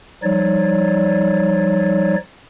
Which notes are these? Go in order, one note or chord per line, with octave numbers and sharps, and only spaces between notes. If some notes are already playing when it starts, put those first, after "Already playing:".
F3 G3 D#4 C#5 D5